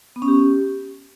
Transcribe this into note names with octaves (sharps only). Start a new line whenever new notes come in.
B3
C#4
G4